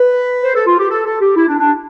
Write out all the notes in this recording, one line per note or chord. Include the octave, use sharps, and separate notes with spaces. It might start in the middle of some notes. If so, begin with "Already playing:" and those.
Already playing: B4
C5
A4
F4
G4
A4
A4
G4
E4
D4
D4